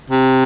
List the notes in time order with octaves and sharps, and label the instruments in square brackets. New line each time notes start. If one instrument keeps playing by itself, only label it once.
[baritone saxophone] C3